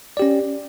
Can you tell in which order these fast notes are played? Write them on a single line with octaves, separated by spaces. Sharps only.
D5 G4 C#4